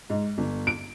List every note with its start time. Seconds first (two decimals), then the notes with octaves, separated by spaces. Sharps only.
0.10 G#2
0.38 G1
0.67 D7